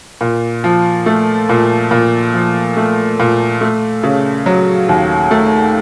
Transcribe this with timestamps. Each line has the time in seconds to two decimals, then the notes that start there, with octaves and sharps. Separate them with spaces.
0.21 A#2
0.64 F3
1.06 A3
1.49 A#2
1.91 A#2
2.34 F3
2.77 A3
3.20 A#2
3.61 A3
4.03 C#3
4.46 F#3
4.89 D#2
5.31 A3